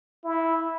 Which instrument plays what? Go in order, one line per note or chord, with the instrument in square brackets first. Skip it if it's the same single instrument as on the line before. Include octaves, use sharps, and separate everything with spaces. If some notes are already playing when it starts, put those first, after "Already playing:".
[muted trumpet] E4